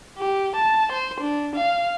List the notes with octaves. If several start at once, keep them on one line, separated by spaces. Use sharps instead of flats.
G4
A5
C5
D4
F5